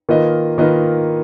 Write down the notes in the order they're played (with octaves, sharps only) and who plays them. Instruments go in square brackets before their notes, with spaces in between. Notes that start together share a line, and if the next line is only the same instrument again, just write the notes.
[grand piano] D#3 A#3 F4 B4 D#5
D#3 A#3 F4 B4 D#5